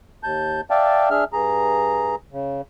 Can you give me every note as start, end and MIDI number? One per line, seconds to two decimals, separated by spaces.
0.23 0.61 39
0.23 0.61 81
0.23 0.61 91
0.70 1.09 74
0.70 1.09 76
0.70 1.09 77
0.70 1.09 79
0.70 1.09 81
1.11 1.24 62
1.11 1.24 68
1.11 1.24 76
1.11 1.24 89
1.33 2.15 43
1.33 2.15 68
1.33 2.15 82
2.32 2.61 49